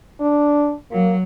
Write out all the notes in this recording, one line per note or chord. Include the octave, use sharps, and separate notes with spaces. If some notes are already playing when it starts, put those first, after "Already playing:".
D4
F#3 A#3